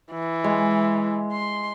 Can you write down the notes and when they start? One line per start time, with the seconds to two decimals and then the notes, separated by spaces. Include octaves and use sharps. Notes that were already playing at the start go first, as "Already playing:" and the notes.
0.11 E3
0.44 G#3
1.32 C6